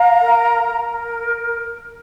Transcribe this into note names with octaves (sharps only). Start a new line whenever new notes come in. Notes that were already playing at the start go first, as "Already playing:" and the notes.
Already playing: F5 A#5
A#4
A#4